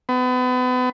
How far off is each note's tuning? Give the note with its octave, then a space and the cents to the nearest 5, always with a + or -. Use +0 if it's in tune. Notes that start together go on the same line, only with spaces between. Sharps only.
B3 +35